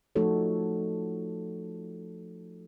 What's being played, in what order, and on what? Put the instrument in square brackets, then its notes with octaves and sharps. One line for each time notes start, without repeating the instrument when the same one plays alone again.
[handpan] F3 A3 D#4 F#4 A4 C#5